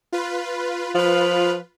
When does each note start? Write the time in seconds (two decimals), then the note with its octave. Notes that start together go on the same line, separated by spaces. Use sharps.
0.12 F4 B4
0.95 F3 F4 B4